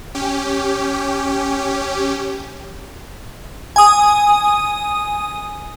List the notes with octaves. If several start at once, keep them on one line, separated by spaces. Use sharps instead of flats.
C#4 G4
G#5 D#6